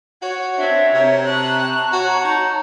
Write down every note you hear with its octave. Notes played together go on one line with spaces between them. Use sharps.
F#4 C#5
C4 D4 C#5 E5
C3 A#4
A5 A#5 C#6 F#6
F#4 C#5
D#4